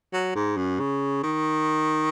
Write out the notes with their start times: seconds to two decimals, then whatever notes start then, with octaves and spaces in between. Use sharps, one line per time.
0.13 F#3
0.35 G#2
0.57 F#2
0.80 C#3
1.23 D#3